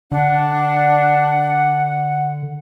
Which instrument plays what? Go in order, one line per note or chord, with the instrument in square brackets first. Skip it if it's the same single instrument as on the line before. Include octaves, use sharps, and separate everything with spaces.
[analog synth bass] D3 [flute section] D4 [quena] F#5